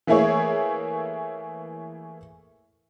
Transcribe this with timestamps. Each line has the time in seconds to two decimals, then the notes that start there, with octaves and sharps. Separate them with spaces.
0.07 E3 A3 A#3 E4 G#4 C#5